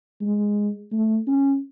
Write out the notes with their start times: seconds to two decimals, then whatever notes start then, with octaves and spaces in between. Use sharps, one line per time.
0.21 G#3
0.92 A3
1.27 C#4